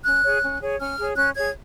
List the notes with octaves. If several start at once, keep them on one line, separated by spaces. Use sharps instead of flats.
C#4 F#6
G#4 C#5
C#4
G#4 C#5
C#4 F6
G#4 C#5
C#4 F#6
G#4 C#5 G#6